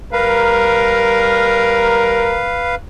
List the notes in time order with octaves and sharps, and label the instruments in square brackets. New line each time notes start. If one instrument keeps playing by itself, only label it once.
[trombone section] G3 A#4 [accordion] B4 F5